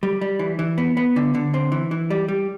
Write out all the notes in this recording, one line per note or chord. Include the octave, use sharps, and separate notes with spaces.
G3
G3
E3
E3
B3
B3
D3
D3
C4
E3
E3
G3
G3